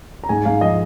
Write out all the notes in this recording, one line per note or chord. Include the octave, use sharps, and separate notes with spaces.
A#5
G#2 G#5
G#2 F5
F3 D#5